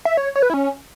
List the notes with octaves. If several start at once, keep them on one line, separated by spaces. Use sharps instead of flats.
E5
C#5
C#5
B4
E4
C#4